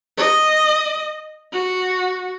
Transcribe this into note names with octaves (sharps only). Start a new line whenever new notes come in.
D#5
F#4